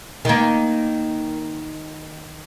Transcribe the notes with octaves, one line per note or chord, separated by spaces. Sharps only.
D#3 A#3